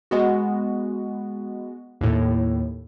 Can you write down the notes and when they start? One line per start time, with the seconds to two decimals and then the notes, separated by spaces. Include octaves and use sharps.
0.11 G#3 B3 F#4
2.01 D#2 A2